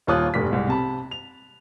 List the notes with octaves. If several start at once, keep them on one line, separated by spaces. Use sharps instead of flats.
D#1 D#2 F4 C#5 D#6 F#6
F1 G2 G3 B6
C2 G#2
C3 A5 B5
F7